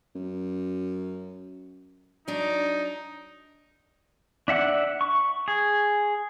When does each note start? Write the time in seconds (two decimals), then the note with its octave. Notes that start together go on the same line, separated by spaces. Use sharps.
0.15 F#2
2.28 F#3 D4 D#4
4.48 D4 E5 F#5 F#6
5.01 C#6
5.48 G#4